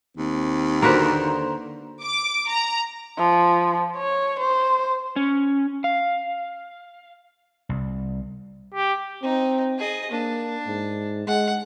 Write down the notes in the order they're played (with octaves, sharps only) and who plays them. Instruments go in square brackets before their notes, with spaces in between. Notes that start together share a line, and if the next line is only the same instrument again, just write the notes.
[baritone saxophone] D#2 [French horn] C4
[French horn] D3 [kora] A#3 F#4 B4 [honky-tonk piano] C5 A#5
[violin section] D6
A#5
[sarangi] F3
C#5
C5
[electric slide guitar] C#4
F5
[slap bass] C2
[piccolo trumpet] G4
[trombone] C4 [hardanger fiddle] D#4
[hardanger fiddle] G#4 D#5
[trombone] A#3 [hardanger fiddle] D4
[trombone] G#2
[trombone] G#3 [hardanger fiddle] F#5